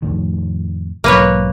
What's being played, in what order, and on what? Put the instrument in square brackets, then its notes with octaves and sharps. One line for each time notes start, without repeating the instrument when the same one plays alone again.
[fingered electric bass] F2 A2 D#3
[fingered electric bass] B1 G#2 F#3 [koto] A#3 B4 C#5